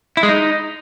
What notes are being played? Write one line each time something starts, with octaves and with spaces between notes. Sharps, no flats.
E4
G#3
D#4